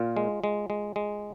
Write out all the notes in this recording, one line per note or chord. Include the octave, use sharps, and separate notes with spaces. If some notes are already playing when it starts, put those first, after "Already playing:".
Already playing: A#2 F4
G#3
G#3
G#3
G#3